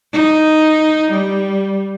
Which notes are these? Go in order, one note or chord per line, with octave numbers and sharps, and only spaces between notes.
D#4
G3